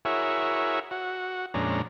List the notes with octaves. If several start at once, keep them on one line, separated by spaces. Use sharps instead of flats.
E4 F#4 G#4 A#4 C#5 E5
F#4
F2 A#2 G#3 C#4 D4 A#5